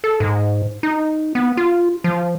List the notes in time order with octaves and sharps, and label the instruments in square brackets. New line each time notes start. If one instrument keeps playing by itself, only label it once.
[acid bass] A4
G#2
D#4
B3
F4
F3